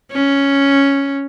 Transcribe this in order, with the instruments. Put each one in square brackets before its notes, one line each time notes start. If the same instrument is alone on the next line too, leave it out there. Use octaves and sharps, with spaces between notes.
[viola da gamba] C#4